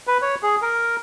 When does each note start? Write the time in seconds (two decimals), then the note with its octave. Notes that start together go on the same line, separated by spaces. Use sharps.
0.07 B4
0.22 C#5
0.43 G#4
0.62 A#4